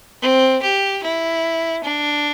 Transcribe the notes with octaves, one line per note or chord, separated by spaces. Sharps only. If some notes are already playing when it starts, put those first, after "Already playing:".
C4
G4
E4
D4